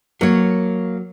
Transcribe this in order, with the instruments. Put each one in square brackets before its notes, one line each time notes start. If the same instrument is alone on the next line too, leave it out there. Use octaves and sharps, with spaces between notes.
[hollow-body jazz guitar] F#3 [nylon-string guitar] A#3 C#5